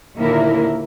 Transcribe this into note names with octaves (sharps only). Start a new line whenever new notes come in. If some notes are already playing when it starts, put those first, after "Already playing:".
D#2 A#2 D3 A#3 E4 A#4